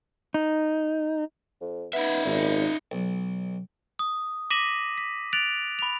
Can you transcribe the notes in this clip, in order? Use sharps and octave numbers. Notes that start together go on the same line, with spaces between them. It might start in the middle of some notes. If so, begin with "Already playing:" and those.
D#4
F2
B3 D#4 E5
G#1 A#2
B1
D#6
D6 A#6 B6 D#7 E7 F#7
B6
F#6 A6 D7 F7 F#7
B5 F7